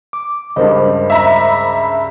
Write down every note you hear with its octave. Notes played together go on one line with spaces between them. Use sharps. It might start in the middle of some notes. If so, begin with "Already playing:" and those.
D6
C#2 G2 A#4 C5 D#5
E5 A#5 B5